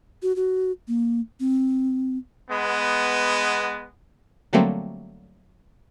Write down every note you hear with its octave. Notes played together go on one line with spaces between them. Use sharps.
F#4
F#4
A#3
C4
G#3 B3
D3 F#3 G3 A3 A#3 C4